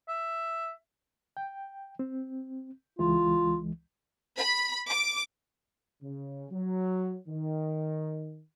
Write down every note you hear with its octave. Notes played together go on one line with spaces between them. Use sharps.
E5
G5
C4
C#2 E3 G#3 F4
B5
D6
C#3
F#3
D#3